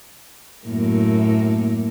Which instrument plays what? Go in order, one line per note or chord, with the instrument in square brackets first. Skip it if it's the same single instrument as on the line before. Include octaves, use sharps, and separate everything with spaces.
[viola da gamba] F#2 A2 A#3